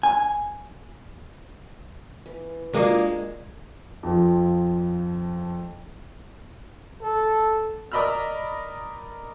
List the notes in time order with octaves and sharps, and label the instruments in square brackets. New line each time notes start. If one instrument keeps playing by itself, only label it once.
[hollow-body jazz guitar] G#5
[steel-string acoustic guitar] E3
[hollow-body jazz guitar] G#3 [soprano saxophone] A#3 [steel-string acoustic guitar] D4 [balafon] F4 F#4 D6
[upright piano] F2 F3
[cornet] A4
[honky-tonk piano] A#4 D5 D#5 B5 E6 F6